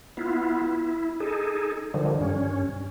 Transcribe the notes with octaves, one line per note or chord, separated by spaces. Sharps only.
B3 E4 F4
E4
D#4 G#4 A4
D3 D#3 F3 G3
G2 C#4